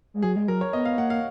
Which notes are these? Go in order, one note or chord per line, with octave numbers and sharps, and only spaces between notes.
G#3
F#3 G#4
G#3
F#3 A#4
C#5
B3 D#5
F5
A#3 F#5
F5